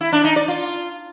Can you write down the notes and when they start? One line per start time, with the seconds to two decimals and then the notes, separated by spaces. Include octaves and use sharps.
0.01 E4
0.12 D4
0.24 D#4
0.36 D5
0.48 F4